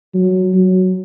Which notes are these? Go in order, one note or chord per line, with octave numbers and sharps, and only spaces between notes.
F#3
F#3